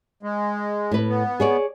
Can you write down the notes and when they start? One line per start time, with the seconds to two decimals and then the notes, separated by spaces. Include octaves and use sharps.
0.23 G#3
0.91 A2 B4
1.09 B3
1.40 G#4 C#5 D5